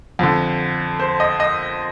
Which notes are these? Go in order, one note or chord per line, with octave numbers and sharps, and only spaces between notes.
F2 D3
C5
D#5
D#5